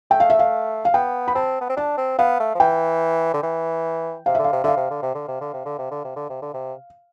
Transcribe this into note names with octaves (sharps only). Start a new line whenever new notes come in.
A3 G5
F5
E5
F5
F5
B3 G5
B5
C4 A5
B3
C4
D4 A5
C4
B3 F5
A3
F3
E3 G5
D3
E3
C3 F5
E5
D3
F5
C3
D3 E5 F5
C3
D3
C3
D3
C3
D3
C3
D3
C3
D3
C3
D3
C3
D3
C3